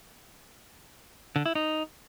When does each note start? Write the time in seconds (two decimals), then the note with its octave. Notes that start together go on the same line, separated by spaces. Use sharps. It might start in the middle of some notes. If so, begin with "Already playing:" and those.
1.36 D3
1.46 E4
1.55 D#4